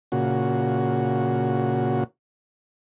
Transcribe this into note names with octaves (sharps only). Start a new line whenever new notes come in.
A#2 C#3 F#4